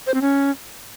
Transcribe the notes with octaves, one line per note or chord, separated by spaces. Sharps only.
C5
C4
C#4